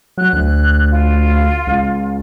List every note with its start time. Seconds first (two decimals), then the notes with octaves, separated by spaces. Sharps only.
0.17 F#3 F#6
0.33 D2
0.89 F4
1.67 C#2